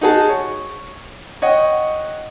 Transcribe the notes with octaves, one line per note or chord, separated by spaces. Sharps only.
D#4 F#4 G#4 A5
C#5
C#5 D#5 F#5 G5